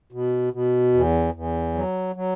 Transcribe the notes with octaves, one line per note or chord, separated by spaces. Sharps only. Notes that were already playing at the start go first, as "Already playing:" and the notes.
B2
B2
E2
E2
F#3
F#3